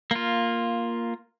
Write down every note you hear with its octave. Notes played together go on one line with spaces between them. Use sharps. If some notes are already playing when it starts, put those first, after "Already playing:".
A#3 F4